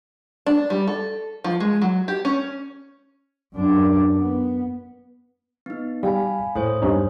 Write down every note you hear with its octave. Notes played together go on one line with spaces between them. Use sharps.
D4
G3
A4
F3
G#3
F#3
G4
C#4
F#2 D4
B3
B3 D#4
G3 F5 G#5 B5
A2 C5 C#5 D#6
G2 C#4 D#4